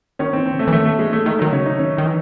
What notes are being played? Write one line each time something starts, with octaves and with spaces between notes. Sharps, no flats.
D#3 C#4
C4
E3
C4
C#3
A3
E3
D#3 A3
A3
E3 G#3
A3
D#3 A3
D#3 F#3
C#3 C#4
D#4
D#3 C#4
D#3 D#4
E3